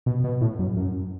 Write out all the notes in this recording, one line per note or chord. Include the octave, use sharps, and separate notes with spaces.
B2
B2
A2
F#2
F#2